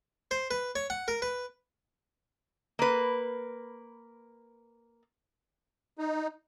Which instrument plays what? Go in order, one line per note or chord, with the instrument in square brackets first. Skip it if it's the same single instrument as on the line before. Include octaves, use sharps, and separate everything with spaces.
[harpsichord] C5
B4
C#5
F#5
A#4
B4
[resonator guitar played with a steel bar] A#3 B4
[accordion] D#4